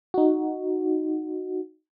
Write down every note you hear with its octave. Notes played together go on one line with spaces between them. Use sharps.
D#4 F#4